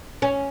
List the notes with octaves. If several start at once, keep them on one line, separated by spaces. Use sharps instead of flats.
C#4